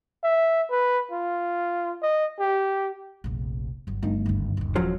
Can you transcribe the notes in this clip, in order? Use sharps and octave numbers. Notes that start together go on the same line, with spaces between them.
E5
B4
F4
D#5
G4
F1 A#1
G1 F#3
G1 D#3 A3
F#1 C#2
D#1 D#4
F#2 F3 F#3